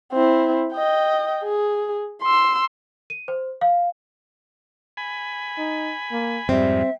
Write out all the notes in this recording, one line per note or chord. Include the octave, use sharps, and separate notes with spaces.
C4 E4
D#5 G5
G#4
C6 E6
D#7
C5
F5
G#5 B5
D#4
A#3
F2 G#2 G3 C4 E5